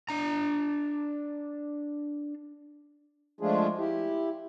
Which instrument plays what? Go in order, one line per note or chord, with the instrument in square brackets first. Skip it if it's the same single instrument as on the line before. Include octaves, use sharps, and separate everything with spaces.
[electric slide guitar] D4 A#5
[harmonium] F3 G#3 A3 D4 F4 G#4
E4 G4